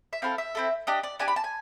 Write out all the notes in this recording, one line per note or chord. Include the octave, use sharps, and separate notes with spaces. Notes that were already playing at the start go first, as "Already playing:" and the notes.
E5
C4 E4 A4 F5
E5
C4 E4 A4
D4 G4 D#5
D5
D4 G4 G#5
B5
A5
G#5